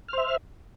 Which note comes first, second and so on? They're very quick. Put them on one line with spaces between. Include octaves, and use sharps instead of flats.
F6 C5 E5